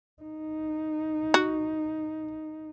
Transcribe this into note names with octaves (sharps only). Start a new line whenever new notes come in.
D#4
F#4